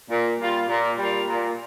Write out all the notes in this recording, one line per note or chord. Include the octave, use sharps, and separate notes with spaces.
A#2
G3 A#3 F4
A#2
G3 A#3 F4
A#2